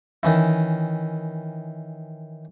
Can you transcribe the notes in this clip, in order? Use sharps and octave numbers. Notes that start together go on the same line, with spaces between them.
D#3 E3 C#4 E4